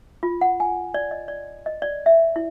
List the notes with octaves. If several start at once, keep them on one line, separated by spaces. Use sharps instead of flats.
F4
F#5
G#5
D5
D#5
D5
D#5
D5
E5
E4